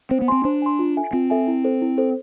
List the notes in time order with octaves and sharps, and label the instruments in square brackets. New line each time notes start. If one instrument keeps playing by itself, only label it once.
[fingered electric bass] C4 [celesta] C5
[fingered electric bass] B3
[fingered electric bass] C4 [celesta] G#5 C6
[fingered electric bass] D4 [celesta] C5
[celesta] G#5 C6
F4
A4 E5 G#5
[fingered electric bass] C4 [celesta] F4
[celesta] A4 E5 G#5
E4
A4 C5
E4
A4 C5